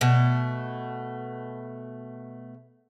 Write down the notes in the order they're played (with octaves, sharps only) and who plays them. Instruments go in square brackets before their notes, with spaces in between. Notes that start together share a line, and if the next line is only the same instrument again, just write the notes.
[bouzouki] B2 A3